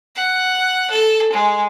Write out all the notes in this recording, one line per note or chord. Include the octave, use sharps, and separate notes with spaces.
F#5
A4
G#3